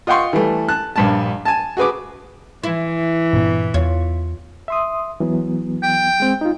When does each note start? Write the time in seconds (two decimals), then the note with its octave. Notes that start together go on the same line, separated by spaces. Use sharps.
0.07 F4 D#5 F#5 G5 C6 C#6
0.33 E3 G3 A3
0.68 A5 F#6
0.96 A#1 G2 A5
1.45 G#5 A5
1.77 F#4 G#4 B4 D6
2.63 E3 E4
3.33 G2 A#2 B3
3.74 E2 F4 C#5
4.68 E5 C6 D#6
5.20 E3 F#3 B3
5.83 G5
6.20 G#3 C4
6.41 D#4 F4